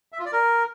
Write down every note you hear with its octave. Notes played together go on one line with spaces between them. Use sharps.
E5
F4
D5
A#4